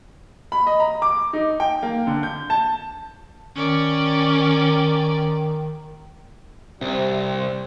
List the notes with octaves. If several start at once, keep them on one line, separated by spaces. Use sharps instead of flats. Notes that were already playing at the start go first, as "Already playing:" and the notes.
B5
D#5
A#5
D6
D#4
G5
A#3
D3
G6
A5
D#3 C#4 D5
C2 C3 G3 C4